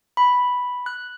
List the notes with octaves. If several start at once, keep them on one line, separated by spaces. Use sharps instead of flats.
B5
F#6